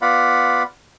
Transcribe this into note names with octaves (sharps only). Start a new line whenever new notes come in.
B3 F4 D5 F5 F#5 B5